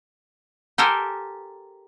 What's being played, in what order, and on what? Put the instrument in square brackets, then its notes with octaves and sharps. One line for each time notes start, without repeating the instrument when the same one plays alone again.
[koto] G4 A4 A#4 C5 G#5